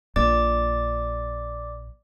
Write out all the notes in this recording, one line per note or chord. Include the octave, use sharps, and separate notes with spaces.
A#1 A#2 D5 D6 A6